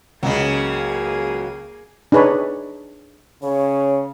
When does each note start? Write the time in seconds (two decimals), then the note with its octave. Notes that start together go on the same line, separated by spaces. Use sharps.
0.23 C#2 C#3 F#3 A#3 G#4 D#5
2.12 D4 D#4 G#4 B4 C#5
3.43 C#3 C#5